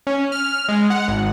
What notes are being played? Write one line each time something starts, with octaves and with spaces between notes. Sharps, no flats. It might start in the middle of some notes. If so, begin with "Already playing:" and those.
C#4
F6
G#3
F#5
G#1